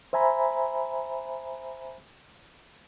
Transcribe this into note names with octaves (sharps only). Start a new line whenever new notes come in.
C5 E5 G#5 A#5 B5